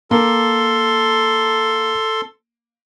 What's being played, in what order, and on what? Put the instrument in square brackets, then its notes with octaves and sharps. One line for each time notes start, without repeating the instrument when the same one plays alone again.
[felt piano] A#3 [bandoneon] A4 C6